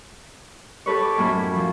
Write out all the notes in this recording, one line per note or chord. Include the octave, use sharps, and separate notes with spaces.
G4 A4 B4 C#5
D6
F#2 A2 C#4 B5
F3